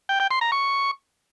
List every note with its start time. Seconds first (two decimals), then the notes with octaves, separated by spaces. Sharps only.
0.09 G5
0.20 G5
0.31 C6
0.41 A#5
0.52 C#6